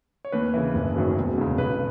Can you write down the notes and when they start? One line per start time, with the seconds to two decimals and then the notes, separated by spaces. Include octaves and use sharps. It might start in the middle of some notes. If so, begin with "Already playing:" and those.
0.25 C#5
0.32 D#2 B4
0.54 C#3 E3
0.75 F#1
0.96 F#2 D#3 F#3
1.16 E1
1.38 E2 C#3
1.58 B1 B4